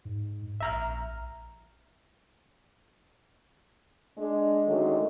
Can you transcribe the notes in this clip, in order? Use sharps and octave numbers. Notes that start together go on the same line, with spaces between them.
G#2
A#1 E5 A#5 F6
G#3 D4
D3 D#3 F#3 G#3 A3 C#4